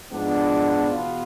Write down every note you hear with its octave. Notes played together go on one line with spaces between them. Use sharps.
G#2 F3 B3 D4
E2 B2 B3 F4